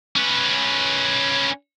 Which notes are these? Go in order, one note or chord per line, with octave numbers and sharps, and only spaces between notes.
C#4 B4